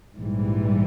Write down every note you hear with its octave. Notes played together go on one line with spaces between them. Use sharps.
A#1 G#2 E3 G3